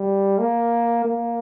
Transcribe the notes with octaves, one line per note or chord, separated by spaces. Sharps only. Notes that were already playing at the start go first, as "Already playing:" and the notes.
Already playing: G3
A#3
A#3